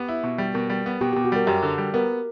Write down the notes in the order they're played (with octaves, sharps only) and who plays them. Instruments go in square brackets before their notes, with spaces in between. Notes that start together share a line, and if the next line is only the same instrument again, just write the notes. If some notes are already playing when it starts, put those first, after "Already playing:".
Already playing: [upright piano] B3 [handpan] G4
[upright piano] E4
B2
G3
[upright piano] B2 [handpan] A#4
[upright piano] G3
B3
[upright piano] B2 [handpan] G4
[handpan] G4
[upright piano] B2
[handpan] F#4
[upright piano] G3 [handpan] A#4
[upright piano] F#2 [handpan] G4
[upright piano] D3
G3
[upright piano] B3 [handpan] A#4